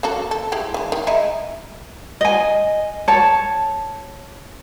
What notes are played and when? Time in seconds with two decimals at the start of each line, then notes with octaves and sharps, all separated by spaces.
0.03 A#3 F#4 A4
0.31 A4
0.52 G#3 E4 G4
0.74 E3 G#3
0.92 D#3
1.07 G#3 D#4 E4
2.21 D#5 G#5
3.08 C#5 A5